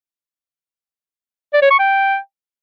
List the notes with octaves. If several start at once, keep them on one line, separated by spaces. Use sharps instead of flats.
D5
C#5
C#6
G5